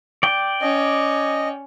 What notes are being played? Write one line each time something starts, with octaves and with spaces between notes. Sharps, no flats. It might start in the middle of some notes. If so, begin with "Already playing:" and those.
D5 G5
C#4 D#5